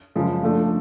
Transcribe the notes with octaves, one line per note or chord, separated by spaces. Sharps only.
F#2 C#3 F3 G#3
F3 A3 D4